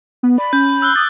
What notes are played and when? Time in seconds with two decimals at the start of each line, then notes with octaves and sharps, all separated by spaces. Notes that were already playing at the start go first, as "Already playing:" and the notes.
0.23 B3
0.38 D5 B5
0.53 C#4 G6
0.82 E6 F#6 G7
0.96 D6 D#6 A6